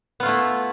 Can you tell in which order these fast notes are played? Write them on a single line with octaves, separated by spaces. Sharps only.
B3 F4 A3 E4